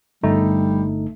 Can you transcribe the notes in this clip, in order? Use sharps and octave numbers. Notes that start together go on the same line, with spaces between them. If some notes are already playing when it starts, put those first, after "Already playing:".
G1 G3 A3 D#4